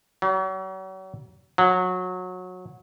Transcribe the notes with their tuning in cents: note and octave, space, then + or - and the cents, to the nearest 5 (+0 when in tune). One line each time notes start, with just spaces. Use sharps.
F#3 +40
F#3 -20